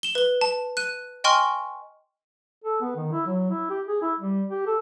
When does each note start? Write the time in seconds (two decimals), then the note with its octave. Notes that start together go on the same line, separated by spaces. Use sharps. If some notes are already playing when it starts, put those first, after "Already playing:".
0.03 E7 G7
0.15 B4 G7
0.41 A5
0.77 F#6 D#7
1.24 D#5 G5 G#5 C6 C#6 F6
2.64 A4
2.81 B3
2.96 D#3
3.12 E4
3.26 F#3
3.50 E4
3.70 G4
3.87 G#4
4.02 E4
4.19 G3
4.49 G4
4.66 A4